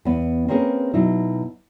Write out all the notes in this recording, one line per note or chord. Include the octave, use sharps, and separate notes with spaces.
E2 B3
A#3 C4 C#4 G#4 A#4 B4
B2 F#3 D#4 E4